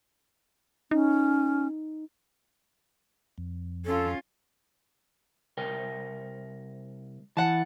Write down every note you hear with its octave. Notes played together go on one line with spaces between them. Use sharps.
C#4 D#4
F2
C#4 F4 A4
C2 A#4 G5
E3 F#5 A5